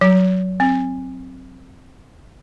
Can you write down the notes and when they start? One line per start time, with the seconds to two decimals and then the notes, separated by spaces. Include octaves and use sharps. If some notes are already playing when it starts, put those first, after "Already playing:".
0.01 F#3
0.60 C4